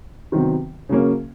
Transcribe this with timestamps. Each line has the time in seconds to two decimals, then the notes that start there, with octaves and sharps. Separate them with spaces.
0.32 C3 D#3 F#3 B3
0.89 C#3 F#3 A#3 C#4